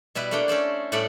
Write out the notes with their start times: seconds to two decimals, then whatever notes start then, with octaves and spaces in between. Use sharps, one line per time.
0.15 B2 G3 E4 B4
0.31 A3 A#3 D4 F#5 G5
0.48 C#4 A4 C5 D5
0.92 A2 G3 A3 D5 F#5 B5